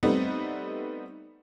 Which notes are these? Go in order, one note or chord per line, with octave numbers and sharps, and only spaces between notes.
G3 A3 B3 C4 D#4